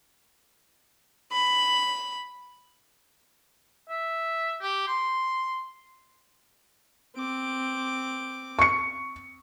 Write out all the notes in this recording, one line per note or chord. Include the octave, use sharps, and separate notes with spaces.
B5
E5
G4
C6
C4 D6
C#6 C#7